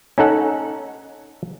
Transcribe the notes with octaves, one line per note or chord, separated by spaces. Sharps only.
C#4 D#4 A4 F#5